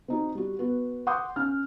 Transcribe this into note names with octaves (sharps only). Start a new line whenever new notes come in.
C4 D#4 F#4
G3 F#4
B3 F#4
F#5 C6 D6 D#6 G6
C#4 F6